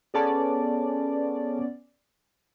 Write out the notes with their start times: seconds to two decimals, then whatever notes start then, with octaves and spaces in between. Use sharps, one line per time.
0.14 B3 C#4 G#4 A4 D5 A5